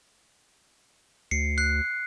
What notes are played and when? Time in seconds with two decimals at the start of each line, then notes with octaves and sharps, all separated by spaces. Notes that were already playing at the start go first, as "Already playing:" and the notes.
1.31 D2 C7 C#7
1.58 F#6 C7